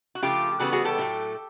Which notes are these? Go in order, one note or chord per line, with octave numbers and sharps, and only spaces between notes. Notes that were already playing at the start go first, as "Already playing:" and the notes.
F#4
C#3 F3 A3 F4 G4
C#3 E3 G3 B3 F#4 G#4
F#4 G#4
G4 A4
A2 F#3 A3